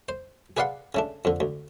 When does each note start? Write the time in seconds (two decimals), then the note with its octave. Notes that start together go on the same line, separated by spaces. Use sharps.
0.09 C5
0.57 G#4 B4 D5 F5 F#5 C6
0.95 C#3 A3 D4
1.25 F2 D3
1.40 D2